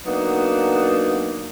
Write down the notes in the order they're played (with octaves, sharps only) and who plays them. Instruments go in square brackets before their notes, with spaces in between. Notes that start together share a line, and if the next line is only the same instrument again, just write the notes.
[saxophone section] F#3 A#3 B3 D4 D#4